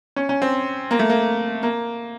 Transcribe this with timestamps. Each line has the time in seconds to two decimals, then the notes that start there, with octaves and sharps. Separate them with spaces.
0.16 C#4
0.29 C#4
0.42 C4
0.91 A#3
0.99 A3
1.10 A#3
1.63 A#3